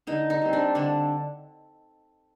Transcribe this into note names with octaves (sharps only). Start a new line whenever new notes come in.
D3 D#4
D#4
G3 C4
D4
D3 D4